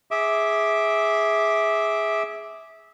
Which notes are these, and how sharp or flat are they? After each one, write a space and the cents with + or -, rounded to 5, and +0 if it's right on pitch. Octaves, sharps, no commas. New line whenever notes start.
G#4 +0 E5 -15 D6 +0